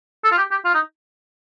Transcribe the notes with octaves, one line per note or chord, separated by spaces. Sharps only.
A4
F4
G4
G4
F4
D#4